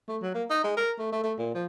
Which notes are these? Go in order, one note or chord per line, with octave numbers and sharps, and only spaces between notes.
A3
F#3
A#3
D#4
G#3
A#4
A3
A3
A3
A#2
F3